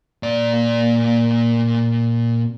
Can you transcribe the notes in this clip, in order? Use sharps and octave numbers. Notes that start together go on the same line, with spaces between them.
A#2 D5